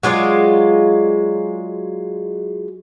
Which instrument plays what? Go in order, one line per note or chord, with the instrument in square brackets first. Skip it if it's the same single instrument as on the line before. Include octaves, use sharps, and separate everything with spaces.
[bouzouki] F#3 G#3 F4 D5